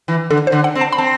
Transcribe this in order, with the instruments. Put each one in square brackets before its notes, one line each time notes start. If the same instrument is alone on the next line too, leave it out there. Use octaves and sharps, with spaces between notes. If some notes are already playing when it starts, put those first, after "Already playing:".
[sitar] E3
[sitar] D3 [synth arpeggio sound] A4
[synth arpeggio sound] C5
[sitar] D3
[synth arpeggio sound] F#5
[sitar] C4
[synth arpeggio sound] A5
B5
[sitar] C4 [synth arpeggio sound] A5